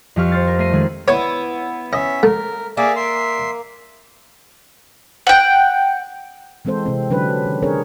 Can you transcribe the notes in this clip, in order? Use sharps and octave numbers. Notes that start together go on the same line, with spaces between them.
F2 F3 G4 F5 C#6 F6
C5 F6 A6
A#4
A3 A#4 A#5 C7 D#7
D#3 G#3 G#4 A4
B3 E4 C#5
C#4 D#5 E5
A3 A#4
A#3 G#4 D5 E5
E5 C6
F#5 G5
E3 G#3 C4 A4 C5
C3 C4
D3 F#3 C#4 D4 B4
D#3
C4 D4 G#4 A#4 C#5